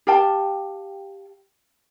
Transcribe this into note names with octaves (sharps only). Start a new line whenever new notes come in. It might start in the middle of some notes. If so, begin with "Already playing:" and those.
G4 F5 G5 A5